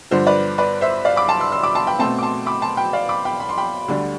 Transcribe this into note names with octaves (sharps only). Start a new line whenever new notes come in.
G2 D3 F3 C5
B4 D5
B4 D5
C5 E5
D5 F5
B5 D6
A5 C6
C6 E6
C6 E6
B5 D6
A5 C6
G5 B5
B2 A3 C4 A5 C6
D6
A5 C6
B5 D6
A5 C6
G5 B5
D5 F5
B5 D6
G5 B5
B5
C6
G5 B5
D2 D3 G3 D4